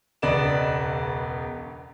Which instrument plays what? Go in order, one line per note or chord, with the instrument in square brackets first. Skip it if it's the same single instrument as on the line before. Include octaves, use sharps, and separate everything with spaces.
[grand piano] E1 C#2 B3 D5 D#5 E7